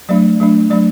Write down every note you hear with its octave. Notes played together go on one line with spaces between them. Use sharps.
F#3 A3 D4 D5
F#3 A3 D4
F#3 A3 D4 D5